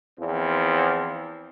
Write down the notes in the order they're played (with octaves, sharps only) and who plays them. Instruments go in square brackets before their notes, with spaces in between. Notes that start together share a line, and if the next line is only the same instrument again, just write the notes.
[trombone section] E2 F3 C4